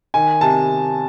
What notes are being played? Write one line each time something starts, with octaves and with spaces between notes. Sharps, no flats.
D#3 G#5
C3 A5